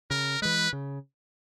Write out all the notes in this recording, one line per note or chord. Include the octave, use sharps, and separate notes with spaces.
C#3 A#4
E3 G#3 B4
C#3